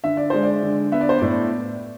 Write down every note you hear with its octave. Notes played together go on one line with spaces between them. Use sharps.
D3 E5
D5
G#3 C5
D5
D3
B3 E5
D5
C5
A2 D5